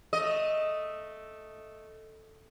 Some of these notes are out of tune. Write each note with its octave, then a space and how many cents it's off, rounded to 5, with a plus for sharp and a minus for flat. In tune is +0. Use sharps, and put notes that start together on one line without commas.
A3 +0 D#5 +0